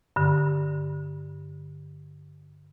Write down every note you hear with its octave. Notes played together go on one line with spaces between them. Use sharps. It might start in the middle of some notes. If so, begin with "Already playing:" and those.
G2 D3